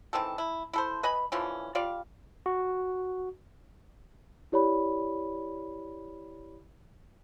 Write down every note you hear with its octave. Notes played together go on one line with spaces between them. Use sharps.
D#3 E3 C4 A4
E4
E4 A4 C5
B4 D#5 G#5 B5
D3 E3 F3 C#4
G3 F4 D5 F5
F#4
E4 G4 C#5 D5 B5